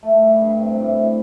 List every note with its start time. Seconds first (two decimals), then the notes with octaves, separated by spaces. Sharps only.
0.03 A3
0.22 G3
0.41 G2
0.60 C3
0.80 A2